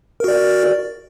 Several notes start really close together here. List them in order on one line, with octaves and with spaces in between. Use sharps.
A#4 F#4 D5